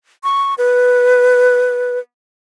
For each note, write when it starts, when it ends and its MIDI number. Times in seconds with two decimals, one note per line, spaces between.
0.24 0.54 85
0.58 1.99 71